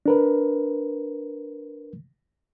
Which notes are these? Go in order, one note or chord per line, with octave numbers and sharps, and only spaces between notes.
D4 A#4 B4